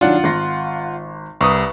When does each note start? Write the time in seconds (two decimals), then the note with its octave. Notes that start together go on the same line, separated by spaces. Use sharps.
0.01 D#3 F#3 D4 F4 F#5
0.24 G#1 C6 A#6
1.41 C2 B4 A#5 C#6 D#6